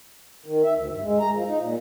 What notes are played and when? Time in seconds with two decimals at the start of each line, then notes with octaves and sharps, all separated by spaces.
0.46 D#3
0.64 E5
0.76 D2
0.90 G2
1.03 G#3
1.20 A#5
1.34 F3
1.47 D#4
1.60 A#2